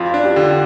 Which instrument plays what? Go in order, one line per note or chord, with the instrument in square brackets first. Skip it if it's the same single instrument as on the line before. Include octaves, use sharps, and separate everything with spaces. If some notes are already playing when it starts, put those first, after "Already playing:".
Already playing: [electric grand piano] F2 [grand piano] F4
[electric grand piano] D4
[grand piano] G4
[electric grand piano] D3